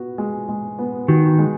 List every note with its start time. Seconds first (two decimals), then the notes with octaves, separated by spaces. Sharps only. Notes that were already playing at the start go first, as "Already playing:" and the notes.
Already playing: B3 F#4
0.18 G#3
0.49 G#3
0.79 B3
1.08 D#3 F#4
1.39 G#3